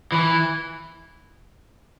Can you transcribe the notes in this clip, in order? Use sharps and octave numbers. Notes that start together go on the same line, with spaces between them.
E3